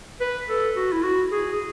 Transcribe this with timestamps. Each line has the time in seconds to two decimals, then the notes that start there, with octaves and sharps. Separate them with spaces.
0.21 B4
0.49 A4
0.76 F#4
0.92 E4
1.04 F#4
1.32 G#4